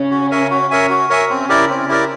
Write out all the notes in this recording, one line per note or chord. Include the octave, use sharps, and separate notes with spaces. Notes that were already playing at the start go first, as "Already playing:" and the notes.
Already playing: C#3 C#4
F#4
A#4 C#5 E5 G#5
F#4
A#4 C#5 E5 G#5
F#4
A#4 C#5 E5 G#5
C#3 C4 C#4
E4 G4 A#4 D5
C4
E4 G4 A#4 D5